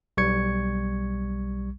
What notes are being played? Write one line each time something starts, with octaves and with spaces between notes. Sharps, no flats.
B1 G3 C#6 G#6 C#7